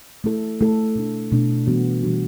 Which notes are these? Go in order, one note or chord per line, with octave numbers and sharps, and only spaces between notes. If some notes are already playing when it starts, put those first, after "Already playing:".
A3 E4 A4
A3 E4 A4
B2 A3 D4
B2 A3 D4
E3 G3 B3 D4 F#4
E3 G3 B3 D4 F#4